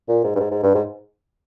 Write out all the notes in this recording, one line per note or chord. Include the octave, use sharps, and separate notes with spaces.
A#2
G#2
G2
G#2
G#2
G2
G#2